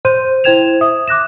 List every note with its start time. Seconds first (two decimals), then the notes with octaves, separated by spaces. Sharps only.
0.05 C5 C6 G6 D#7
0.44 E4 C5 G5 G#6 E7 F7
0.81 E5 D#6
1.08 D6 F#6 A#6 E7